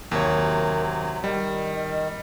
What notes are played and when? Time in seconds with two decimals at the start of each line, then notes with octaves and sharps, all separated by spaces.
0.12 D#2 C3 F#3 A#4 C#5
1.24 D#3 G3 D#5